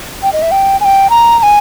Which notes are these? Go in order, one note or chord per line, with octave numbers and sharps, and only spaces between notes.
G5
D#5
E5
G5
G#5
G5
A#5
A#5
G#5